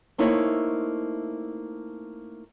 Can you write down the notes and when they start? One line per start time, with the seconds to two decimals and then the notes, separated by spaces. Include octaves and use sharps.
0.18 A3 A#3 C4 D#4 E4 C#5